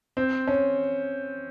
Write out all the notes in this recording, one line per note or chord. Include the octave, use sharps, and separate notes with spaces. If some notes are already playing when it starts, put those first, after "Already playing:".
C4
C#4